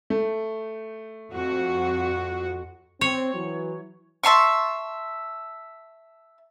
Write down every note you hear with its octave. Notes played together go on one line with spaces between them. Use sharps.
A3
F2 F#4
C4 C#5
E3 F#3
E5 A5 C6 C#6